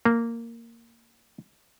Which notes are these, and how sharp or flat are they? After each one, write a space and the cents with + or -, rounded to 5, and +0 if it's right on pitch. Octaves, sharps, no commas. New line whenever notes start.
A#3 -10